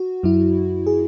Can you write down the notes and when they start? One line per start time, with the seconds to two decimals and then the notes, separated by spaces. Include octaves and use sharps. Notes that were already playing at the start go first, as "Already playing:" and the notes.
Already playing: F#4
0.23 F#2 F#3 E4
0.87 G#4